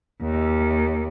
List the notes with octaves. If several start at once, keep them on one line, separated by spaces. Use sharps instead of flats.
D#2